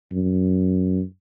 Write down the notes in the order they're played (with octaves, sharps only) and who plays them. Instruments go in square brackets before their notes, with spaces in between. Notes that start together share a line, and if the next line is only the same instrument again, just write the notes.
[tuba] F#2